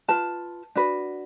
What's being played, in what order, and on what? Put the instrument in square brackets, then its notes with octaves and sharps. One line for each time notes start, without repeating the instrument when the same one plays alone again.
[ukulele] F4 B4 A5
D4 F#4 B4